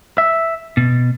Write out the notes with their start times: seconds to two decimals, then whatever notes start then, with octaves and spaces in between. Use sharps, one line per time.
0.18 E5
0.77 B2